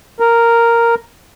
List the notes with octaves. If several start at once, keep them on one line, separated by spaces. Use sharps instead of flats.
A#4